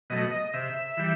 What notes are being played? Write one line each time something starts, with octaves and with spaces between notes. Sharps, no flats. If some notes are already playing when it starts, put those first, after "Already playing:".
B2 F#3 A3 D#5
D#5
C3 E5
E3 G3